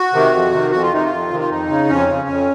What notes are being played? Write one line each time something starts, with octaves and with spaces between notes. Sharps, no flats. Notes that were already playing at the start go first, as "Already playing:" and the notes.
Already playing: F#4
C3 D#3
F2
C3 D#3
F2 F#4
F4
C3 D#3 D#4
F4
F2
C3 D#3
F4
F2 D#4
C#3
F2 C#4
C#3
F2